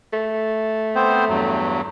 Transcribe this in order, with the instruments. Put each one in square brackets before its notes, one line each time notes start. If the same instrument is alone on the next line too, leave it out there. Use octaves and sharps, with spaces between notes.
[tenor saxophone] A3
[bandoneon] B3 C4 C5
E2 G2 F#3